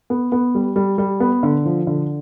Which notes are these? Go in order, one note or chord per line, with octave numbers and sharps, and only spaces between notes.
B3
B3
G3
G3
G3
B3
D3
F3
D3